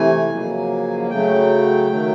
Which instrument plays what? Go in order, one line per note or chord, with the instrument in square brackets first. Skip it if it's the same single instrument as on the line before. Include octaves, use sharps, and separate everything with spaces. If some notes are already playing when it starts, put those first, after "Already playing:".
Already playing: [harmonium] C3 E3 A3 G#5
F2 C#3 F#3 A#3
C#3 F#3 A3 G5
D#3 F#3 A3